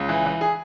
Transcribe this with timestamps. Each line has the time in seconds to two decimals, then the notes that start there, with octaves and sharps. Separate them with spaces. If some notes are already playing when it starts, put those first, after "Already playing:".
Already playing: C#2
0.09 E3
0.26 E3
0.41 G#4